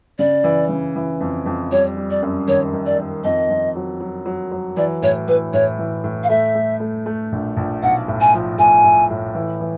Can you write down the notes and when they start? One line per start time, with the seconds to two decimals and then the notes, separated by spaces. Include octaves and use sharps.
0.19 C#3 D5
0.44 E3
0.69 C#3
0.96 E3
1.21 F2
1.46 F2
1.72 G3 C#5
1.97 G3
2.10 D5
2.22 F#2
2.48 D#3 C#5
2.73 D#3
2.86 D5
2.99 D#3
3.24 F2 D#5
3.50 F2
3.75 F#3
4.00 F#3
4.25 F#3
4.51 F#3
4.77 E3 D5
5.02 A2 C#5
5.28 E3 B4
5.53 A2 C#5
5.79 E3
6.04 A2
6.24 F5
6.29 A3 E5
6.55 A3
6.80 A3
7.06 A3
7.32 A#1
7.57 A#1
7.83 B1 F#5
8.08 A2
8.21 G#5
8.34 F3
8.58 A2 G#5
8.84 A2
9.10 A2
9.35 E3
9.61 E3